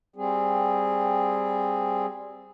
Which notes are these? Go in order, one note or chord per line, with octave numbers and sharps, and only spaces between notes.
G3 C4 G#4